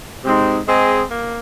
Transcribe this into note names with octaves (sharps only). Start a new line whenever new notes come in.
C3 G#3 C4 D#4 C5
G#3 C4 G#4 D#5
A#3